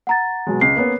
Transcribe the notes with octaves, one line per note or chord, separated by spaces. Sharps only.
F#5 A#5 A6
B2 F#3 G#3
C#2 C7
A#3 B3 C#4